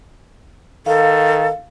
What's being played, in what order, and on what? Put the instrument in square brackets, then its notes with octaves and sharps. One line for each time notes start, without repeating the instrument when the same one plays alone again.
[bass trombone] D#3 [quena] A4 [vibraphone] F5